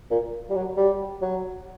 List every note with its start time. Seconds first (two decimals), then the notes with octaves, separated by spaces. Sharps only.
0.11 A#2
0.50 G3
0.55 F#3
0.77 G3
1.22 F#3